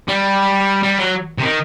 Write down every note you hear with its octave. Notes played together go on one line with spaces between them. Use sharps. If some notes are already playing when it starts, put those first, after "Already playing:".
G3
G3
F#3
C3
D#3